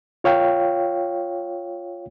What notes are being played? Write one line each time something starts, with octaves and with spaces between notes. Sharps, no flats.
F4 C#5 F5 G5